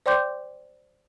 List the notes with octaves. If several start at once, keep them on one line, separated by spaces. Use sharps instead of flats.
C5 D5 G5 C6 D6 G6